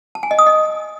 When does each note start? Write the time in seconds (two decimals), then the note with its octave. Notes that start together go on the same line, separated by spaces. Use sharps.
0.15 A5
0.23 G#5
0.31 D#5
0.39 D#6
0.46 D#5